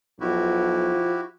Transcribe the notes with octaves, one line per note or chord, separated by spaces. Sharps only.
B1 F3 E4 F#4 G4